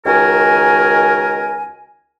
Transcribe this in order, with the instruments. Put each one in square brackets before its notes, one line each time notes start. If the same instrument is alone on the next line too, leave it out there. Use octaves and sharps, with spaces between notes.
[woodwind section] C#2 D#3 F#4 A#4 G#5